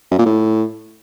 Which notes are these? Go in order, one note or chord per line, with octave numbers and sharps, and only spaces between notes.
F#2
A#2
A2